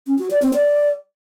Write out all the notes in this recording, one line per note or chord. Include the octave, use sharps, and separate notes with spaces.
C#4
F#4
D5
C4
D5